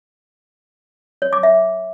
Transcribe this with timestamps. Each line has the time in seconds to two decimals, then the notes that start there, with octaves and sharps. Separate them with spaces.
1.22 C#5
1.33 D6
1.43 E5